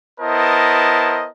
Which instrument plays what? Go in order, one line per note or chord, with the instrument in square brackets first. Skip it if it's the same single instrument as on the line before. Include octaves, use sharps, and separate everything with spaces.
[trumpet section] B3 E4 A#4 C5 D#5 A5